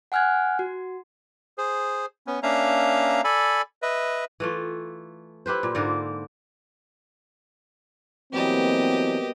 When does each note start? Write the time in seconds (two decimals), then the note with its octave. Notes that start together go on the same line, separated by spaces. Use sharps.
0.12 F#5 G#5 F6 F#6 G#6
0.59 F#4
1.58 G#4 C5
2.27 B3 C#4
2.43 A#3 C#4 D4 E5 F5 A#5
3.24 A4 D5 G#5 B5
3.82 B4 D#5 E5
4.40 E3 A3 F4
5.46 E4 G4 B4 C5
5.63 A#2
5.75 G#2 D3 A#3 A#4
8.33 B2 E3 F#3 G3 A#3 C4 G4 D#5